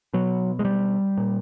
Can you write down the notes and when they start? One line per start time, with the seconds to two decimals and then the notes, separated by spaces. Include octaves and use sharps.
0.13 B2 F#3
0.59 G#3
0.65 G3
1.17 A#2